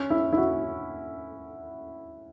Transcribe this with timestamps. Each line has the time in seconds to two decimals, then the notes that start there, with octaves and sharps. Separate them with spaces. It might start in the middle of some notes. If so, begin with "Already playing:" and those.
Already playing: C#4
0.10 E4
0.33 E4
0.37 F#4